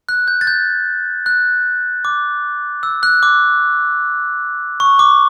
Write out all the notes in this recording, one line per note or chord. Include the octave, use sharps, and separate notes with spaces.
F#6
G6
A6
G6
F#6
D6
E6
F#6
D6
C#6
D6